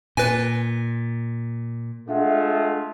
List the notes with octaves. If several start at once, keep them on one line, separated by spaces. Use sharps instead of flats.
A#2 B4 G#5
G#3 A3 D4 F4 E5 F#5